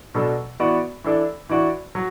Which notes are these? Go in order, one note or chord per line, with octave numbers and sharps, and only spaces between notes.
B2 F#3 B3 D4 A4
E3 B3 F#4 D5
E3 D4 A4 D5
E3 D4 F#4 D5
F#3